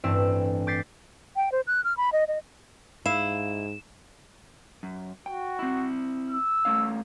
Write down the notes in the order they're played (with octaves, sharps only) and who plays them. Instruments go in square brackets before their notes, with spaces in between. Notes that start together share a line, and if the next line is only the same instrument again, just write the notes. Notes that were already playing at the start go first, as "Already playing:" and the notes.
[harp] A1 G2 C4 E4 E6
D6 G6 A6 B6 C7
[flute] G5
C5
F#6
F6
B5
D#5
D#5
[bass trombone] G#2 [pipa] E4 [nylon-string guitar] F5 [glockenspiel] E7
[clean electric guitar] F#2
[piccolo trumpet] F#4 [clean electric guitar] G5
[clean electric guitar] C4 E4
[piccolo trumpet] E6
[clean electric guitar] A3 C#4 F5